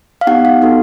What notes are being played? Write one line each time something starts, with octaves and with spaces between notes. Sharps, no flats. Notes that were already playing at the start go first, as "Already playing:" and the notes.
F5
B3 D#4 G4 F#5
F5
B3 D#4 F#4 A4